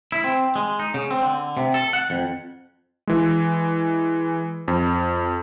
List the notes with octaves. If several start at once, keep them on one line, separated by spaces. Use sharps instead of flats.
E4
C4
G#3
D#4
C#3
C4
D3
C3
A4
F#5
F2
E3 G#3
F2